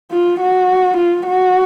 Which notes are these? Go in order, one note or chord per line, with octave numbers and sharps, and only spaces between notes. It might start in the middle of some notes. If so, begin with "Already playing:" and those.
F4
F#4
F4
F#4